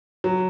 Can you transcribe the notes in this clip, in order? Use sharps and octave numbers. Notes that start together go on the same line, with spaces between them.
F#3